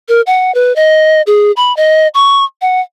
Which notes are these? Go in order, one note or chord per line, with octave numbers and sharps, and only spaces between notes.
A#4
F#5
B4
D#5
G#4
B5
D#5
C#6
F#5